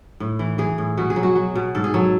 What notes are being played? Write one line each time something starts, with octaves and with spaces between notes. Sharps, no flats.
A2
E3
E3 G#4
A2
B2 F#4
G#4
F#3
F#4
F#3
B2
G#2 A4
G#4
F#3 A4